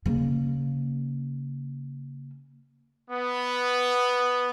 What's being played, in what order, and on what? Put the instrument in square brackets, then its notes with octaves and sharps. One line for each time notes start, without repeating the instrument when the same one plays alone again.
[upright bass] C#3 A#3
[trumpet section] B3